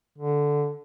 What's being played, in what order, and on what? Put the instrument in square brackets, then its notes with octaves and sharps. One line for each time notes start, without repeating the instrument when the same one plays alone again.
[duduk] D3